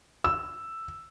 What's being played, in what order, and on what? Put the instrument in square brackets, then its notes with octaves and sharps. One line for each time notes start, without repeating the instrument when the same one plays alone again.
[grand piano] E6